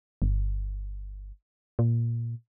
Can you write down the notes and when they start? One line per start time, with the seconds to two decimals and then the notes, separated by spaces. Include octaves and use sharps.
0.22 G1
1.79 A#2